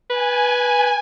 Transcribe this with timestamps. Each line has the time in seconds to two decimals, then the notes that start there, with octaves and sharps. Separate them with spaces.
0.10 B4 G#5